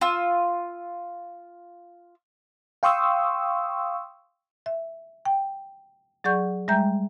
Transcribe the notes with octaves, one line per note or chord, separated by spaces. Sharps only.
F4 E6
F5 G5 C6 C#6 D#6 E6
E5
G5
F#3 G#4 D5 F#5 C#6 G6
G3 G#3 E5 G5 A#5 G6